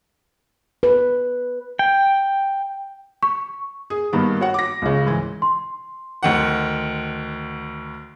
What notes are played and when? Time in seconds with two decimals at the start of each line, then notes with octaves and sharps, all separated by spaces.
0.83 B4
1.79 G5
3.23 C#6
3.90 G#4
4.13 G2 D#3 A#3 B3
4.40 F#4 C#5 F#5
4.54 D6 A#6
4.82 C#2 C#3
5.07 G#2 E3
5.42 C6
6.23 D2 D#3 F#5